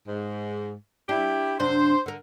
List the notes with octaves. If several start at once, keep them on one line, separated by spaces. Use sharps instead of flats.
G#2
D4 E4 G4
F#2 C3 D4 C5
D3 A#4